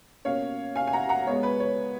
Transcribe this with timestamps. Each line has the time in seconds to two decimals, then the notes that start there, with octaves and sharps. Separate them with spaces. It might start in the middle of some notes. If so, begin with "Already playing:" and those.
0.25 B2 A#3 C#4 C#5 F5
0.75 F5 G#5
0.87 G#5
0.93 F#5 A#5
1.09 F#5 A#5
1.27 B2 G#3 B3 C#5
1.43 B4
1.60 C#5